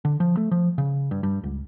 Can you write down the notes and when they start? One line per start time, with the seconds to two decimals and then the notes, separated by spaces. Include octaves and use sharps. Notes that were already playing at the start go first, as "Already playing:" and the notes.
0.05 D3
0.20 F3
0.37 A3
0.51 F3
0.78 C#3
1.11 G2
1.23 G2
1.43 C#2